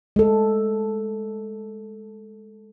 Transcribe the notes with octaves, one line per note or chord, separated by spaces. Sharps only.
G#3 A4